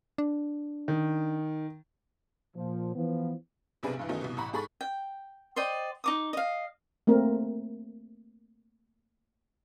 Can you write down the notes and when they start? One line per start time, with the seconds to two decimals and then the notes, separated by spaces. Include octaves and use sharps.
0.18 D4
0.88 D#3
2.56 A#2 F3
2.95 E3 F3 B3
3.83 B1 C3 D4 G#4 B4 D7
3.97 B1 G2 E3
4.09 D#3 F#3 A3 B3 C#4 D#4
4.21 C2 B2
4.37 A1 F#5 A#5 B5 C#6
4.53 G#2 G#4 A4 B5 C#6 A6
4.81 G5
5.56 C5 D5 D#5 G5
6.04 D#4 D6 D#6
6.33 D#5 F5
7.07 A3 A#3 C4 A#4